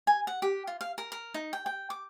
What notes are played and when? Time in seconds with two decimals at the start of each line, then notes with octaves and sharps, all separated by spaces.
0.07 G#5
0.27 F#5
0.42 G4
0.67 F4
0.81 F5
0.98 A#4
1.12 A#4
1.34 D#4
1.53 G5
1.66 G5
1.90 D6